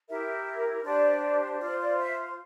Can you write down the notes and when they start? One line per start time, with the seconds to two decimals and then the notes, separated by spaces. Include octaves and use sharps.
0.09 E4 G4 A#4 E5
0.84 D4 G4 C5 D5
1.61 F4 C5 D5
1.80 D5
1.99 E5